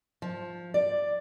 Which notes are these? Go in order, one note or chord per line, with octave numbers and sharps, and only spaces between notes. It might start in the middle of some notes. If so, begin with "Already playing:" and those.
F3
D5